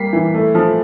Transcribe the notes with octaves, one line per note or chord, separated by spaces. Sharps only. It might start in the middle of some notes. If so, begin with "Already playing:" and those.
Already playing: G3 A#3 B6 C7
E3
A3
F3